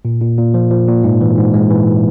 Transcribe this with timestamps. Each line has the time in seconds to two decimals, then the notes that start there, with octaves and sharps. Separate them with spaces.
0.05 A#2
0.21 A#2
0.38 A#2
0.54 F3
0.70 F3
0.88 A#2
1.04 G#2
1.21 E3
1.37 G#2
1.54 G#3
1.70 E3